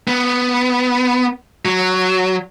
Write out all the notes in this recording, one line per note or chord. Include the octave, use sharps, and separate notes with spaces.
B3
F#3